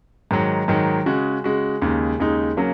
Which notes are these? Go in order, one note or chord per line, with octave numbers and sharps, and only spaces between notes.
G#2 D#3 F#3
G#2 D#3 F#3
C#3 G#3 F#4
C#3 G#3 F#4
D#2 C#3 G#3 D#4
D#2 C#3 G#3 D#4
C#3 F#3 A#3